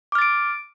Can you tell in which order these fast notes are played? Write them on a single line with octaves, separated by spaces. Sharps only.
D6 F6 A6 D7